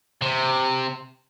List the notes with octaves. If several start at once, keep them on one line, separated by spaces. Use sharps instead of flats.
C3